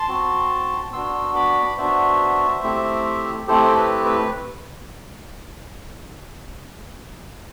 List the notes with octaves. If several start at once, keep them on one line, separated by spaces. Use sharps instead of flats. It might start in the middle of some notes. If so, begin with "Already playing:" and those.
Already playing: A5 C6
C4 F#4
B3 D4 F#4 C6 E6
B5 D6
B3 D4 F#4 C5 E5
A3 C4 E4 G4
A3 C4 E4 G4 A4 C5
B4
B4